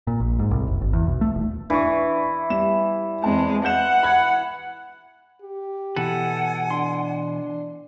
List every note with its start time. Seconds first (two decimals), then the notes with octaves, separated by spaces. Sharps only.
0.07 A#2
0.20 A#1
0.39 G#2
0.51 C2
0.68 F#1
0.81 G#1
0.93 E2
1.07 B1
1.21 A3
1.34 D#1
1.70 E3 D4 C#6
2.50 G3 E7
3.24 E2 G#3 C4 A5
3.65 F#5 G6 E7
4.03 B5 G#6
5.42 G4
5.96 B2 E3 A4 B4 F#5 G#5
6.71 D4 C6